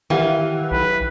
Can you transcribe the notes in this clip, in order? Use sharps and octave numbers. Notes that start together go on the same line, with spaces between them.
D#3 E3 G4 F5 F#5
B1 B4